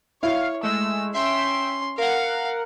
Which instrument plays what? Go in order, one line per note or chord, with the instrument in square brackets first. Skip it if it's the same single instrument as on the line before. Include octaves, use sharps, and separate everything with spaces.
[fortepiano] E4 [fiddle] C#5 [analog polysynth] F5
[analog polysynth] G#3 A3 [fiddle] E6
[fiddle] C#4 C6 [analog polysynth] E5 G5
[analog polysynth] A#4 F#5 [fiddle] F5